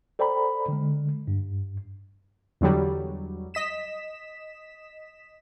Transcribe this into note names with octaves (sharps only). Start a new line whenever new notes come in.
A4 C5 D5 G5 A#5 B5
D3 G#3
G2
E2 D3 F#3 G3
D#5 B6 E7